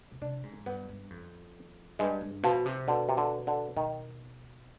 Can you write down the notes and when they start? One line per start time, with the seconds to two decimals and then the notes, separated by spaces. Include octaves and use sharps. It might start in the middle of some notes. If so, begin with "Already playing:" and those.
0.11 B2
0.22 C3 D4
0.43 G#2
0.66 G2 B3
0.89 G2
1.10 F2
1.99 G2 G#3
2.21 G2
2.43 B2 F3
2.66 C3
2.88 B2 D3
3.09 C3
3.17 D3
3.47 D3
3.76 B2 D#3